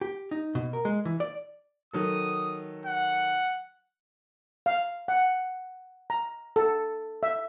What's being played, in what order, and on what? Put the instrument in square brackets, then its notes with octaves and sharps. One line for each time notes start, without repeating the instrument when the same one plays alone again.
[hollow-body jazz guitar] G4
D#4
B2
A#4
G#3
E3
D5
[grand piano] D#3 F#3 A4 [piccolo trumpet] D#6
[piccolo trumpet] F#5
[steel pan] F5
F#5
A#5
A4
E5